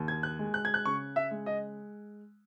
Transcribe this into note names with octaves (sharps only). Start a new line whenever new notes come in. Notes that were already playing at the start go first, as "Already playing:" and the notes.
Already playing: D#2
G#6
F#6
G#3
F#6
G#6
F#6
C#3 C#6
E5
G#3
D#5